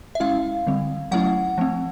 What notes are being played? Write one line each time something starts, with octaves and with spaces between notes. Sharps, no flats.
E5
G#3 C#4 E4 F5
D3 G3 C4
F#3 A3 C#4 E4 F#5
F3 A3 C4